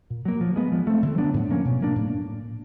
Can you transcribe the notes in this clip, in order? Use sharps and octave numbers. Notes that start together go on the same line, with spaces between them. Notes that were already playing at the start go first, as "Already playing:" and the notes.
A#2
F#3 A#3
F3
G#3 B3
F3
A3 C4
D3
F#3 B3 D4
A2
F3 A#3 C#4
B2
F#3 A#3 D4
A2